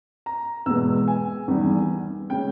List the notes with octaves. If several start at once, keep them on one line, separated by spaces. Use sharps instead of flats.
A#5
E2 B2 G#3 B3 E6
G#5
E2 D#3 G3
C#3 G#3 C#4 G5